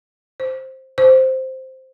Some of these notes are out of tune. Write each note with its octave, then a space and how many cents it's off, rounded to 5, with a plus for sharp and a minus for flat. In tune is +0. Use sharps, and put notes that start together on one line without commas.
C5 +10
C5 +0